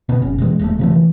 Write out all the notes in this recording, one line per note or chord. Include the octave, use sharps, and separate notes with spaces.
B2 B3
F1 C#4
B2 E3 G#3
E1 G#3 A3
C3 F3 A3
E3